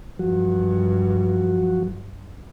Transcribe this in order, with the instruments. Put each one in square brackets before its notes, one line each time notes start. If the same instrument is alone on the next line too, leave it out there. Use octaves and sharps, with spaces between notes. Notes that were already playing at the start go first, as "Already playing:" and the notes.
[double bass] G2 [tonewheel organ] F3 F#3 F#4